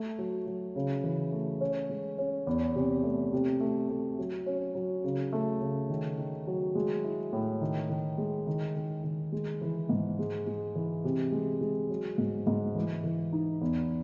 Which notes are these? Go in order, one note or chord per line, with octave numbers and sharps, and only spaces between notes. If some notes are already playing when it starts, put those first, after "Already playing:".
Already playing: A3
F#3
F#3
C#3
E3
A3
C#4
G#3
C#4
E2
C3
A3
C3
A3
A3
F#3
C#4
F#3
C#3
A3
C#3
D#3
D#3
F#3
G#3
E4
A2
D#3
D#3
G#3
D#3
D#3
D#3
G#3
E3
G#2
G#3
G#3
E3
C3
G#3
G#3
F#3
G#2
G#2
E3
E3
D#4
E2